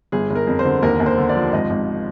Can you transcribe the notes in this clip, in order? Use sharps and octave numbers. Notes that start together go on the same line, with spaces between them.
G1 G#4
G1
A#4
F2
C5
D3
D#2 A#4
D#2
C5
D3
D5
F3
G#1 D#5
G#1